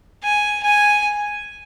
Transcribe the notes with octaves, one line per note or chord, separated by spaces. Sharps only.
G#5
G#5